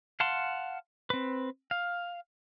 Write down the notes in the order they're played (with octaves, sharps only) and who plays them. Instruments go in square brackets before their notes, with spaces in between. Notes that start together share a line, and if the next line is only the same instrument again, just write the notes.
[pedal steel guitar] F5 F#5 A5 C6
C4 B4
F5